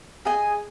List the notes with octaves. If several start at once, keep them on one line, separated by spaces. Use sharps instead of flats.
G#4 D#5 G#5